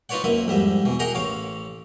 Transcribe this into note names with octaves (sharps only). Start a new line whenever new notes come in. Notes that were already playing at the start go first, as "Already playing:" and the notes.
D#4 F4 B4 C#5 D5 F#5
F#2 A#3 E4 B4
F2 G#2 G3 E5
B2 E3
G#4 A#4 D#5 F#5 G5 A#5
A1 C#5 F5 D6